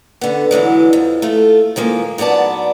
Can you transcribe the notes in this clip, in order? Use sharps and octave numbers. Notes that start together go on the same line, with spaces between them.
D3 B3
D3 E3 F#3 G#3
F2
A3 F4
D#3 F3 G#3 A#3
G#2 F#3 B3 D5 A5